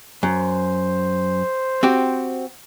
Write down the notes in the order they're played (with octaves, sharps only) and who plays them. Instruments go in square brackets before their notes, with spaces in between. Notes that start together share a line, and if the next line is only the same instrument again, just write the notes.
[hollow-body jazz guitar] F#2 [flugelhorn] C5
[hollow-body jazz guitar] C4 F#4 G4